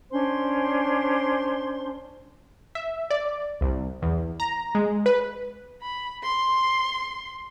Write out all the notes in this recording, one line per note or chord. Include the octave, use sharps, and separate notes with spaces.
C#4 D4 C5 C6
E5
D5
C2
E2
A#5
G#3
B4
B5
C6